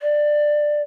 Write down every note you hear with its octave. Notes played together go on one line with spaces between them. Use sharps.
D5